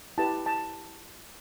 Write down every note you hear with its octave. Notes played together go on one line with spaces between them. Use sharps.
E4 G4 B4 A5
A5